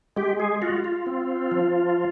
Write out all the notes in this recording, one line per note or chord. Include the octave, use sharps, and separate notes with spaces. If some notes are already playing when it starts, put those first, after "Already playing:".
G#3 G4
G#4
F4 F#4
F4
C4
F3